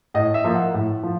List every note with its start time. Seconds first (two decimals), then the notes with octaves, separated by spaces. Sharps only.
0.14 A2 D#5
0.34 E5
0.44 F3 A#3
0.55 F#5
0.74 A2
1.03 F3